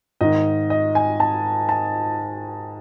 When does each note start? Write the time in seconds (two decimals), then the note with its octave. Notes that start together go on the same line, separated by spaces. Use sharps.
0.21 G#2 D#3 D#5
0.70 D#5
0.95 G#5
1.20 A5
1.69 A5